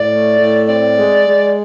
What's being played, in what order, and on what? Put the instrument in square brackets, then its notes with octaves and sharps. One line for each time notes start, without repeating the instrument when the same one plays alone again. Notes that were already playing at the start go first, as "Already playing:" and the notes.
Already playing: [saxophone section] A2 D5
A3
A2
C4 D5
G#3
G#3